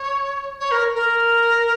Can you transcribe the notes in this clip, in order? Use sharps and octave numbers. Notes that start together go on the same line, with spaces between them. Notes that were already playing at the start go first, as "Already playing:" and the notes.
Already playing: C#5
C#5
A#4
A#4